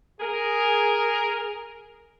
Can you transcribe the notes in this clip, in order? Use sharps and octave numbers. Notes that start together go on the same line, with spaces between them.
G#4 A#4